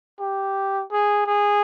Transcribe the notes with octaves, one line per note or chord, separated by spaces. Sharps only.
G4
G#4
G#4